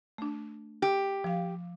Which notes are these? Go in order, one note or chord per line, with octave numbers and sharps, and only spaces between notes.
A3 D4
G4
F3 F5